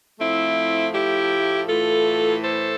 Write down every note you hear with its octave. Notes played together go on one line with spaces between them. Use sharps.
A2 F3 A3 C4 E4
E4 G4
A2 E3 A3 F4 A4
A4 C5